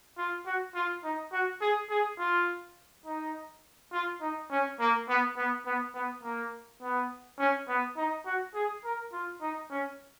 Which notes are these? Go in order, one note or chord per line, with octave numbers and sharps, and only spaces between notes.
F4
F#4
F4
D#4
F#4
G#4
G#4
F4
D#4
F4
D#4
C#4
A#3
B3
B3
B3
B3
A#3
B3
C#4
B3
D#4
F#4
G#4
A#4
F4
D#4
C#4